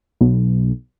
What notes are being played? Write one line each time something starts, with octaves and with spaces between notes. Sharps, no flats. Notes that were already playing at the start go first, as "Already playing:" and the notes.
B1